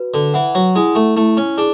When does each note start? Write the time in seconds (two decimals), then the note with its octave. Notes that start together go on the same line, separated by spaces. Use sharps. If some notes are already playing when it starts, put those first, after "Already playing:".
Already playing: F#4 B4
0.14 D3
0.34 E3 F#5
0.55 F#3
0.75 G#3 E4
0.95 A3
1.16 A3 E4
1.37 C#4
1.58 D4 G#4